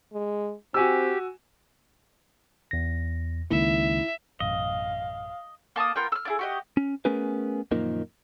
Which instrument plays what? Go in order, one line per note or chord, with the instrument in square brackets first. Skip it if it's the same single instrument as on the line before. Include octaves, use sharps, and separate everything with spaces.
[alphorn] G#3
[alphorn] C4 [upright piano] F#4 G#5 E6 [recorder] G4
[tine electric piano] E2 A#6
[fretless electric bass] C#2 D#3 A#3 [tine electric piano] E4 [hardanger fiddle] E5
[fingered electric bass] A1 F#2 B2 [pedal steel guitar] D#5 [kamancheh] F5
[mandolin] A#3 A5 D6 D#6
B3 F4 A#4 G5
E6 F6
D4 E4 G#4
F#4 G4 D#5
[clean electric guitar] C#4
A3 B3 C#4 G#4 A#4 B4
F#2 A#2 D#3 F3 A#3 D#4